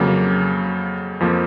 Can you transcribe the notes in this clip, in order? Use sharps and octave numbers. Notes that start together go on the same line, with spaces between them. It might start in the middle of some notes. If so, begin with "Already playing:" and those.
Already playing: F2 C#3 F#3 A#3
F2 F3 A#3